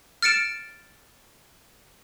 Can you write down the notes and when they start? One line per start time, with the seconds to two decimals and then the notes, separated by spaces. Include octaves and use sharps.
0.22 F6 A6 C#7 D7 E7